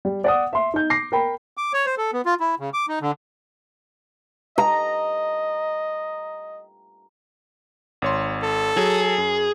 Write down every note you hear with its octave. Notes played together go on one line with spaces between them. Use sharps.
G3
D5 F#5 D#6
E5 C6
D#4 G6
D6 A#6 C7
A#4 G5 B5
D6
C#5
C5
A4
B3
F4
E4
C#3
D6
D#4
D3
D#5 A#5
G#1 C#5 C6
A4
F#3 G#4
F#2